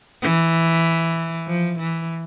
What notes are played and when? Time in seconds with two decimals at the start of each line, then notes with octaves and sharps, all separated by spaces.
0.22 E3
1.48 F3
1.79 E3